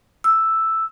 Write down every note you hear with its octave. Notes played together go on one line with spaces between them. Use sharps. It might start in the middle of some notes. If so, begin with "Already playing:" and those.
E6